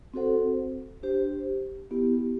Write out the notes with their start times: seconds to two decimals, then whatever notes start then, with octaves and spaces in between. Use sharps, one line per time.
0.14 C4 F#4 A4 C5 F#5
1.03 D4 G4 C5
1.91 B3 E4 G4